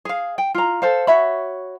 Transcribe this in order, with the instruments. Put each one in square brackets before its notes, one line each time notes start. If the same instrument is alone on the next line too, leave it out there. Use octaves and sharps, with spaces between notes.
[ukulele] G#4 F5
G5
F4 A#5
A4 C5 F5
F#4 C#5 E5 B5